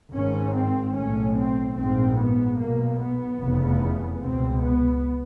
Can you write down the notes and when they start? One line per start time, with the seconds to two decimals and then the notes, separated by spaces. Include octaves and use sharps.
0.13 G#1 G#2 C#4
0.53 C4
0.95 B1 A2 C#4
1.36 C4
1.76 A#1 G#2 C4
2.17 B3
2.58 B1 B2 A#3
2.99 B3
3.39 F1 E2 C#3
4.21 C#2 B2 C4
4.62 B3